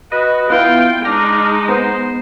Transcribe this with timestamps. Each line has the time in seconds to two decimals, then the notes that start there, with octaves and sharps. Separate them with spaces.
0.12 F#4 B4 D#5
0.50 B3 E4 F4 G5
1.05 G#3 D4 D#4 F6 A#6
1.69 B3 C5